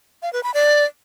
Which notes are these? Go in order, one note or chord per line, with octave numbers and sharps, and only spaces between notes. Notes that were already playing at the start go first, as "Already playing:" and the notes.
F5
B4
B5
D5